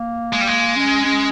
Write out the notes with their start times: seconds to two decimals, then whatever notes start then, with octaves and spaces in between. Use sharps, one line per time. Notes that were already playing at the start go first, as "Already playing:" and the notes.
Already playing: A#3
0.33 G#3
0.41 G3
0.47 G#3
0.76 C#4
1.05 C#4